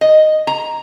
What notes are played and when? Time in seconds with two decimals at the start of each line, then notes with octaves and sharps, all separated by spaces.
0.01 D#5
0.47 A#5